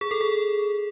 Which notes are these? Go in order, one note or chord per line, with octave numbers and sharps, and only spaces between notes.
G#4
A4
G#4